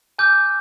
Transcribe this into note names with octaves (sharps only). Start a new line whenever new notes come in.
G#5 D6 F6 G6